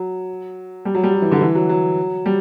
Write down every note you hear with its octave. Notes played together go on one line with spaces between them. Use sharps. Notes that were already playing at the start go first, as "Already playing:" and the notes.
Already playing: F#3
G3
F#3
G3
F#3
E3
D3
E3
F#3
F#3
G3